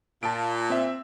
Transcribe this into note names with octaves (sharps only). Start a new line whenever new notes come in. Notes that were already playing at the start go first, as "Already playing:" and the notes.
A#2 A5 D7
C4 E5